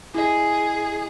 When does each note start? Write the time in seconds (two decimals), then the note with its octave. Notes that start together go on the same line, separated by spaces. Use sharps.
0.15 E4 G#4 D#5